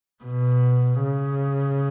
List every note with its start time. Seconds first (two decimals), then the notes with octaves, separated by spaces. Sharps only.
0.24 B2
1.03 C#3